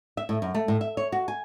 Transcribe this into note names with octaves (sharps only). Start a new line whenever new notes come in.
E5
A2
F#2
A3
A2
E5
C#5
F#4
G#5